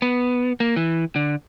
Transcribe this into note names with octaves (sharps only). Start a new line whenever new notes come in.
B3
A#3
E3
D3